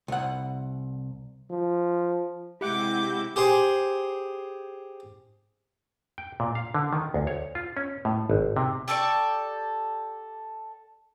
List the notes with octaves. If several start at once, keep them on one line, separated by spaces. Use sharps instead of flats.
C2 F#5
F3
C3 G#3 E4 G4 F#5 G5 D6 G6
G4 G#4 C5
G5
A#2
F5
D3
D#3
D2
C#5
F4
C#4
A2
G#1
C3
G4 A4 D5 C#6